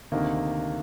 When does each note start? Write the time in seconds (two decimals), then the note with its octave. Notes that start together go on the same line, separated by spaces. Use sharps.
0.12 D2 C3 D#3 A#3